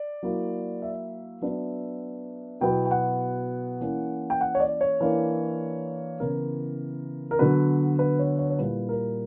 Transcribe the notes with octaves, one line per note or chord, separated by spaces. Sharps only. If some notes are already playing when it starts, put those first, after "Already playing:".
Already playing: D5
F#3 A#3 E4
E5
F#3 B3 D4
B2 F#3 B3 E4 G5
G5
F#5
E3 A#3 C#4 E4
G5
F#5
C#5
D5
C#5
E3 A#3 D4
C#3 E3 B3 E4 A#4
A#4
D3 F#3 B3 B4
B4
C#5
C#5
C#5
A#2 G3 A#3 E4 B4
A#4